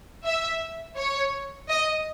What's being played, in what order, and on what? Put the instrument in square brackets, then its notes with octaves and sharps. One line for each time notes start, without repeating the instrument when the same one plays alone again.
[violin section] E5
C#5
D#5